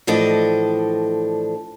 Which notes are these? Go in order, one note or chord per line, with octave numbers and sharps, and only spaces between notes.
A2 E3 F3 D4 A4 D#5